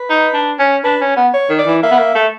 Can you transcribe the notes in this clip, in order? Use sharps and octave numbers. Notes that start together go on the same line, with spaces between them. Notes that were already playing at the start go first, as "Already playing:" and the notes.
Already playing: B4
D#4
D4
C#4
D4 B4
C#4
B3
C#5
D#3
D5
E3
A#3 E5
B3
A#3
A3